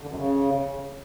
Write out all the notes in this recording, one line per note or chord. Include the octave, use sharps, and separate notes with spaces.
D3
F#2
C#3